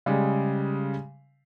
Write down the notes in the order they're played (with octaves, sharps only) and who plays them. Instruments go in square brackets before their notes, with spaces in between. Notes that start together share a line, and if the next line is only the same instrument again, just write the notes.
[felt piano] C#3 G3 G#3